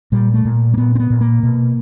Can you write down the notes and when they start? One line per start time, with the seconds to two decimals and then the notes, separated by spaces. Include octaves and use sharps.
0.12 A#2 G3
0.34 A3
0.45 A#2
0.74 A#3
0.77 A#2 B3
0.95 C4
1.00 B3
1.10 A#2
1.21 A#3
1.43 B2